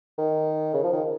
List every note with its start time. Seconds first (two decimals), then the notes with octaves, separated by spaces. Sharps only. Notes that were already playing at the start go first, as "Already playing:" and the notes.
0.18 D#3
0.74 C#3
0.83 F3
0.93 D#3